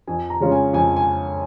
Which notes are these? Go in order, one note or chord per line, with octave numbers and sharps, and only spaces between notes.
F2 G#5
A#5
C#3 G#3 C#4 F4
G#5
F2 G#5
G#5